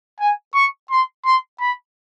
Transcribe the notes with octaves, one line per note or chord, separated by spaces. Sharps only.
G#5
C#6
C6
C6
B5